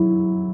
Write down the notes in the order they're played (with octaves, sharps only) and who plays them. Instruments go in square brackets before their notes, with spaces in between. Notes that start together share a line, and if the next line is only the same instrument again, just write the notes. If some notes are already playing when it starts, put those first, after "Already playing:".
Already playing: [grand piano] F#3 E4